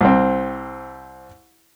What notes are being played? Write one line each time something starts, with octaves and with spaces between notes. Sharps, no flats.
C2 C4